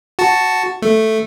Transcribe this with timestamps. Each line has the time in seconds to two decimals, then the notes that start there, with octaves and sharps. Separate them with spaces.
0.19 F#4 A5
0.82 A3